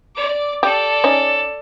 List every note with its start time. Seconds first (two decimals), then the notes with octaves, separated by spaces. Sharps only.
0.15 D5 D6
0.63 G4 A4 D5
1.04 C#4 D#4